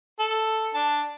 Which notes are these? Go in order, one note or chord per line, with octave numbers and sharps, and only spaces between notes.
A4
D4 A5